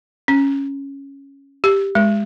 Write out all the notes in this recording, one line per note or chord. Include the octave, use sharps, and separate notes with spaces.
C#4
G4
G#3